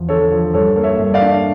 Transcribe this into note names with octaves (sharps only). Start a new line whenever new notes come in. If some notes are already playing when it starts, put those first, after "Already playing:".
Already playing: E2 F3
D3 A4 C#5
F3
G2 A4 C#5
A#3
C#5 E5
G2
D5 F5
D4